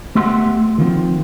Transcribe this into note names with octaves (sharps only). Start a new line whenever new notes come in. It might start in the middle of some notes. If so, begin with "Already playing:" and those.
A3 B3 G4 E5 F#5 C6
D#3 F3 C4